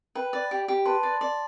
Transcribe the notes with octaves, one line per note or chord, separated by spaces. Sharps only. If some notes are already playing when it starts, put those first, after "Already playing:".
B4 G5 B5
D5
G4
G4
B4 A5 C6
D5
D5